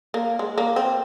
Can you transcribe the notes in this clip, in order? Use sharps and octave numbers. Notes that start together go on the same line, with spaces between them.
A#3
G#3
A#3
C4